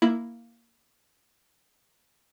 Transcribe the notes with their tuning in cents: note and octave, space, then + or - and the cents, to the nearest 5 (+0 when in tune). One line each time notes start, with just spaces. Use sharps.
A#3 +0 E4 +0